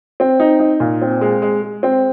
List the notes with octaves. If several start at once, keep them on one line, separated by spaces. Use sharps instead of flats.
C4
D#4
D#4
A#2
C4
G#3
G#3
G#3
C4